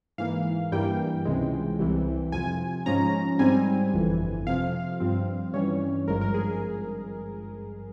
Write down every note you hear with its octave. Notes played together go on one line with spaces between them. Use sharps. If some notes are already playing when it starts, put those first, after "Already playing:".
G#2 E3 A#3 F5
G2 E3 G3 A#3 G5
C#2 C3 E3 G#3
C2 C3 E3
F2 C3 F3 G#5
G#2 F3 G#3 C#4 A#5
G#2 G3 C4 G#5
G1 F2 E3
F2 C3 F3 F5
G2 F3 C4
G2 E3 G3 C#4 C#5
G#1 G2 F3 G#3 A#4
A#4
G#4